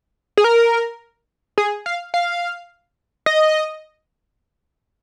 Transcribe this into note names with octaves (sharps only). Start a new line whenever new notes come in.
G#4
A#4
G#4
F5
F5
D#5